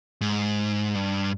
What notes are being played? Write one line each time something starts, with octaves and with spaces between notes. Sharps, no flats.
G#2
G2